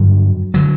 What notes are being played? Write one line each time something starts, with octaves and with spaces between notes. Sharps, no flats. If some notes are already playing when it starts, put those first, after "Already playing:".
Already playing: G2 D3 F#3
D3 F#3